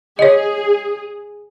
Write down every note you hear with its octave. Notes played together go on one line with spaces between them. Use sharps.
G#4 C#5 D#5